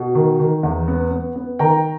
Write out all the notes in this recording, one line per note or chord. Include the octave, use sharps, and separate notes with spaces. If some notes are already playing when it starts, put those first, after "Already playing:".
Already playing: B2
D#3
D#3
E2
B3
B3
B3
D#3 G5 A#5